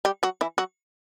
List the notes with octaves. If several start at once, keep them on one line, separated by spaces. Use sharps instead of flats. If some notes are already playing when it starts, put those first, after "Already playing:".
G3 G4
F#3 F#4
E3 E4
F#3 F#4